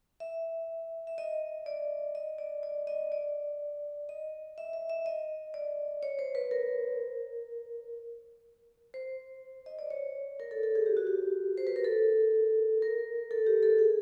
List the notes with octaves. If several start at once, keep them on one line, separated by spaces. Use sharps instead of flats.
E5
E5
D#5
D5
D#5
D5
D5
D#5
D5
D#5
E5
E5
E5
D#5
D5
C#5
C5
B4
A#4
C5
D#5
D5
C#5
A#4
A4
A4
G#4
G4
F#4
G4
C5
B4
A#4
A4
A#4
A4
G4
A4
G#4